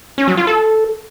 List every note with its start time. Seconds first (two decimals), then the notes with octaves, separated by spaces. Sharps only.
0.18 C#4
0.28 F#3
0.37 F4
0.47 A4